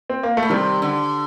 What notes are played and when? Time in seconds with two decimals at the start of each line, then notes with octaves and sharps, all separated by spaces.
0.10 C4
0.23 A#3
0.37 A3
0.43 A#2
0.50 C3 D#3 G3
0.82 D3